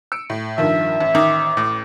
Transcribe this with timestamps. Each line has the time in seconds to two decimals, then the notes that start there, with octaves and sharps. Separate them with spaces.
0.12 E6 C#7 D7
0.30 A2
0.58 G2 D#3 F3 E5
1.01 A1
1.15 D#3 D6
1.57 A2